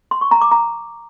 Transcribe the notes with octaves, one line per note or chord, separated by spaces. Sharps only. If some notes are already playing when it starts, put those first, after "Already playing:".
C6
C#6
A#5
D6
A#5